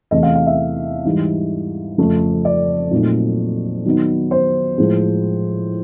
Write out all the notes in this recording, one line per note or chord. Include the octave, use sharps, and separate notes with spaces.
E2 C3 E3 A3 D#5
F5
F5
E5
G#2 E3 G3
F2 C#3 F3 A3
D5
A#2 F#3 A3 C4 D#4
D#3 F#3 B3 D#4
C5
A2 F3 G#3